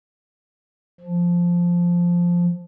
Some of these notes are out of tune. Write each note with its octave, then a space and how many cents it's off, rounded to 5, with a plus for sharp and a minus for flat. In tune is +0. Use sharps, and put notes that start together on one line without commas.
F3 +0